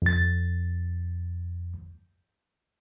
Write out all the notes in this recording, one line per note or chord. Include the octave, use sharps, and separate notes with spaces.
F2 A6